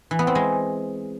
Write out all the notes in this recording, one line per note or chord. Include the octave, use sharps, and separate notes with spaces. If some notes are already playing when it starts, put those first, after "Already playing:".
E3
B3
C4
G#3